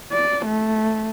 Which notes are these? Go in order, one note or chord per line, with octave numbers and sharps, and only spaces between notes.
D5
A3